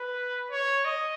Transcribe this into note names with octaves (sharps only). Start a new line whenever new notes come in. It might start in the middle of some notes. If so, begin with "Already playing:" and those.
Already playing: B4
C#5
D#5